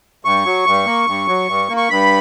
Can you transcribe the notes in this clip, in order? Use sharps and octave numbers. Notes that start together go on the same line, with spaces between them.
G2 C#6
F#3
G2
A#3
G2
F#3
G2
A#3
C#6
G2 B5